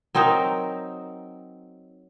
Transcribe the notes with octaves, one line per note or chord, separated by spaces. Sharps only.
F#3 C4 D#4 A#4